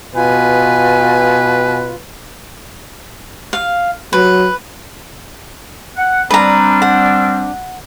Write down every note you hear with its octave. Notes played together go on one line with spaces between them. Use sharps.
B2 F4 B4 G#5
F5
F#3 B4
F#5
G3 C4 D4 B4 A#5
F#5